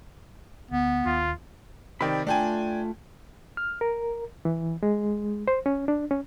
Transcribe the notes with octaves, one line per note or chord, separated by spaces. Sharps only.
D2 B3
D#2 F4
C3 D#3 D5 G5 B5
A3 D4 F4 G5 G#5
F6
A#4
E3
G#3
C5
C#4
D4
C#4